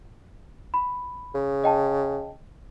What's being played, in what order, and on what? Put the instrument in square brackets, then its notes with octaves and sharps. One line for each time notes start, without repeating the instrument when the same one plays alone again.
[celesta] B5
[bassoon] C#3
[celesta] D#5 G5 A5